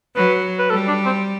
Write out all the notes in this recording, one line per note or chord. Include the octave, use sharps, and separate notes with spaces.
F#3 B4
B4
G3 A4
D4
C4